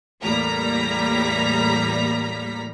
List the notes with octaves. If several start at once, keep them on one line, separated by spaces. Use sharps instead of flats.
E2 A2 G3 A#3 A#5 B6